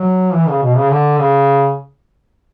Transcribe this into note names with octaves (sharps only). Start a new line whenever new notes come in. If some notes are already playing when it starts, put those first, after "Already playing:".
Already playing: F#3
E3
C#3
B2
C#3
D3
C#3